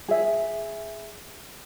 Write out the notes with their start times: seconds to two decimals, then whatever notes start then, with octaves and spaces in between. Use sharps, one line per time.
0.09 G#4 E5